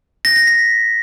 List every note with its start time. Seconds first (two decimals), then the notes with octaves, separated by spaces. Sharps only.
0.25 A#6
0.36 A#6
0.47 B6